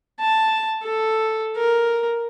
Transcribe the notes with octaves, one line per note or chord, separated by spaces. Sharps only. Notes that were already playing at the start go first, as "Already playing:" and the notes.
A5
A4
A#4